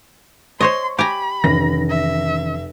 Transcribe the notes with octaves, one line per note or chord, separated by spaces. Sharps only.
C5 C#5 D#5 C6 C#6
G4 G#5 A#5 B5
F1 D#3 E3 C#4 A#6
E5